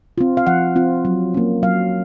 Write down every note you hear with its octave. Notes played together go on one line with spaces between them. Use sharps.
C4 F4
F5
F3 F#5
C4 F4
F#3
A#3 C#4
F#3 F5